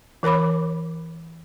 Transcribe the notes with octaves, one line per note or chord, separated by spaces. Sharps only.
E3 A#4 C#5 B5 D6